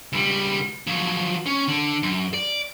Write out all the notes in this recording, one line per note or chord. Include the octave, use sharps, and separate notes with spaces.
C#2 G3
F3 F#3
C#4
D3
F#2
D5